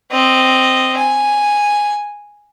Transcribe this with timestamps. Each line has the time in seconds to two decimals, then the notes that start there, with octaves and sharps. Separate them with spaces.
0.12 C4 D#5
0.97 G#5